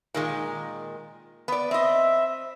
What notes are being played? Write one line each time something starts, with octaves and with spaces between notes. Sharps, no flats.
A#2 D#3 G#3
B3 D5
C4 D#5 E5